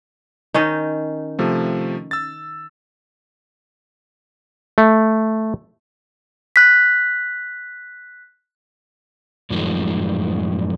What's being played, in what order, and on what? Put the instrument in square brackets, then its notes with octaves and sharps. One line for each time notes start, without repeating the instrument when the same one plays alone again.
[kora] D#3 C#4 D#4
[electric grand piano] C3 F3 A3
E6 A6
[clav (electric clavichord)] A3
[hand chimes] F#6 B6
[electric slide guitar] F#2 A2 D#3 F3 G#3